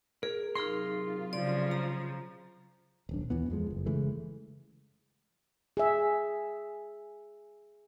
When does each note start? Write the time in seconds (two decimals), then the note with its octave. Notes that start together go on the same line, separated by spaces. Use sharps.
0.23 G#4 A#4
0.55 C3 F#3 D#4 F4 G#4 A#4 C6 F6
1.33 C#3 F3 D5
1.71 A#5
3.09 D#1 B1 D4
3.30 D#2 E3 B3
3.50 F2 F3 G#3
3.70 F#1
3.86 C#3 E3 G#3 A3
5.77 G#4 E5